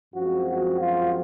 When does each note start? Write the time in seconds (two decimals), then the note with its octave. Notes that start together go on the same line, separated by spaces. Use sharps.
0.15 F#2 F3 G#3 C4 F#4
0.47 F#4
0.79 F4